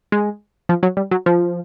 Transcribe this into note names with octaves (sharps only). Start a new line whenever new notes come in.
G#3
F3
F#3
G3
F#3
F3